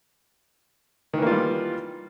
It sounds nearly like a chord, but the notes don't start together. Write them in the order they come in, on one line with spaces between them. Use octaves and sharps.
D#3 E3 A#3 F4 G3